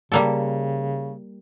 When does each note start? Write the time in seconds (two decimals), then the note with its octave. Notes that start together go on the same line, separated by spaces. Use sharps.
0.12 C#3 G3 A#3 A4